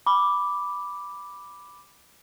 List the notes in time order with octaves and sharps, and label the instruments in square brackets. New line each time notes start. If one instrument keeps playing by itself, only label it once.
[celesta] B5 D6